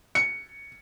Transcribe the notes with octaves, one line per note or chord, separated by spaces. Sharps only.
C#7